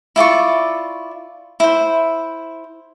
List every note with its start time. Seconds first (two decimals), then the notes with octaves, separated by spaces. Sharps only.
0.16 E4 F4 D5 C#6
1.60 E4 C5